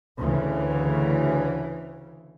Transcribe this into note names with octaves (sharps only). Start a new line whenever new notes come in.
D2 C#3 E3